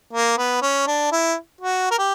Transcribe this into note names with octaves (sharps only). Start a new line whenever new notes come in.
A#3
B3
C#4
D4
E4
F#4
A#4
G4